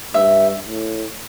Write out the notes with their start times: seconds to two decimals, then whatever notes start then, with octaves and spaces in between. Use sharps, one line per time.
0.14 G2 E5
0.67 A2